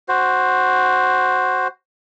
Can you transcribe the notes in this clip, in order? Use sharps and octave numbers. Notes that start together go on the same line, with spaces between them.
F#4 C5